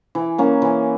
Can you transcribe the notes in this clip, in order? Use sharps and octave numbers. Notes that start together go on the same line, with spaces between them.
E3
A#3 C#4
E3